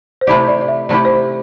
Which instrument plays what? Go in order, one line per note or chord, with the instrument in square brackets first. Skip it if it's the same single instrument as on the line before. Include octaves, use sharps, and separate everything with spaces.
[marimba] C5
[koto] C3 A3 E4 G4 [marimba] D5
[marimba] D5
D5
E5
[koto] C3 A3 E4 G4 [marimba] D5
[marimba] C5